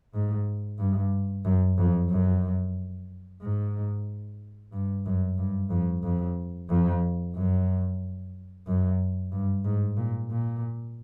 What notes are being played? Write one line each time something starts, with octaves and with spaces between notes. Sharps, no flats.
G#2
G2
F#2
F2
F#2
G#2
G2
F#2
G2
F2
F2
F2
F#2
F#2
G2
G#2
A#2
A#2